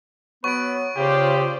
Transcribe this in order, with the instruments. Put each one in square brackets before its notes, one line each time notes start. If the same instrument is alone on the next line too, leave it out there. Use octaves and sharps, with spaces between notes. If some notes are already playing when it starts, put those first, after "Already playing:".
[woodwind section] F#3 B3 [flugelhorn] B4 [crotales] C#6 D7
[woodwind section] C#3 [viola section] F4 C5 D5 [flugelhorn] G4